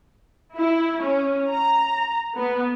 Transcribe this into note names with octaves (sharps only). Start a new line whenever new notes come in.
E4
C#4
A#5
B3